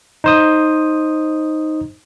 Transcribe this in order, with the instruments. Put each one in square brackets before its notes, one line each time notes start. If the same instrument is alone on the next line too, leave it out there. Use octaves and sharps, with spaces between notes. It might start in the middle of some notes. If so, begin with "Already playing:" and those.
[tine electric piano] D#4 C5 D#6